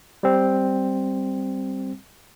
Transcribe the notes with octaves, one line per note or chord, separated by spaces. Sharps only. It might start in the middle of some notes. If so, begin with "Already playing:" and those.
G3 C4